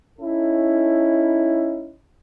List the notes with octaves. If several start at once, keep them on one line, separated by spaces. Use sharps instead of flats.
C#4 D#4 E4 A4